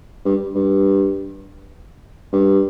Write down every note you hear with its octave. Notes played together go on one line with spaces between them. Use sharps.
G2
G2
G2